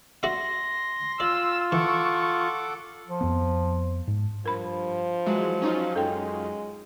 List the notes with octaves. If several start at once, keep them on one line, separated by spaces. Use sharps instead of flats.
F#4 D5 E5 C6 A#6
F4 D5 E6
E3 A4 F#5 C#6 D6
F3
F2 B3
G#2
G2 F3 A#4 B5
E3 F#3 G#3
C#4 D#4 F4
F#2 G#3 A4 G5